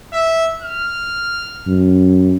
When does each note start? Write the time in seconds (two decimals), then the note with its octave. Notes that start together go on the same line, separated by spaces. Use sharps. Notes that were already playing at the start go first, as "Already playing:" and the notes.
0.12 E5
0.62 F6
1.67 F#2